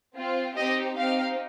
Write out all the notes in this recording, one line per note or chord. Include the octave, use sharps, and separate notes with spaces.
C4 F4
C4 D#4 G4 D#5
C4 D#4 G4 F5